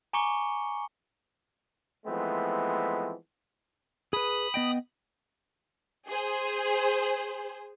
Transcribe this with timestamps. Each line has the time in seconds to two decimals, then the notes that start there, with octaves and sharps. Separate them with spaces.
0.13 G#5 A#5 C#6 D6 C#7 G7
2.06 E3 F3 G#3 A3 B3 C4
4.13 G#4 B4 B5 D#6
4.54 B3 D#5 G5
6.08 G#4 C5